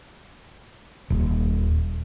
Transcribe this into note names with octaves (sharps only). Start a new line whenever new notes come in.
D#1